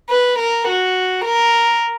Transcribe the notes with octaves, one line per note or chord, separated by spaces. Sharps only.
B4
A#4
F#4
A#4